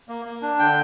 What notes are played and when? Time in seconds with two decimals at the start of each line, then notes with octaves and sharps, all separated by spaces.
0.09 A#3
0.25 A#3
0.42 D4
0.59 D3 G5